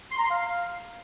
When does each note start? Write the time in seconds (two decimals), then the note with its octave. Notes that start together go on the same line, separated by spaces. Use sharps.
0.12 C6
0.18 A#5
0.24 C6
0.30 F5